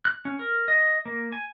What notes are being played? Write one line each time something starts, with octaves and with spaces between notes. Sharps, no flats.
F#6
C#4
A#4
D#5
A#3
G#5